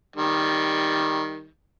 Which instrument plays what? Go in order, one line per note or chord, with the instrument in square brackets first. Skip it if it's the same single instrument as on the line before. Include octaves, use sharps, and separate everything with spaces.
[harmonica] D#3 G3